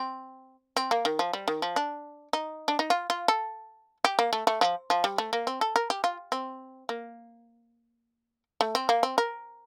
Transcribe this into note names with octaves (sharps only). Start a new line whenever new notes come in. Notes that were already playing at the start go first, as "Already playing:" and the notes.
Already playing: C4
C4
A#3
D#3
F3
G3
D#3
F3
D4
D#4
D4
D#4
F4
F4
A4
G4
A#3
A3
A3
F3
F3
G3
A3
A#3
C4
A4
A#4
G4
F4
C4
A#3
A3
C4
A#3
C4
A#4